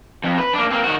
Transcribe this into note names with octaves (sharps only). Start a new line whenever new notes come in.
F2
B4
A#3 D4
A#3 C4
D#3 F#4